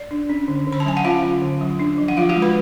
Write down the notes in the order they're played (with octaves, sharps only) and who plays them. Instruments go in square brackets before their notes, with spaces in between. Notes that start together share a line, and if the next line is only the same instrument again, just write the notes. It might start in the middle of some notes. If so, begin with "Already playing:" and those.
Already playing: [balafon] D5
D4
C#4
D3
D3
B5
A5
F#3 G#5
F#5
C#4 F4 F5
D3
D3
F#3
D4
F3
F#5
F3 F4 F5
F#4 F#5
G#3
B4 B5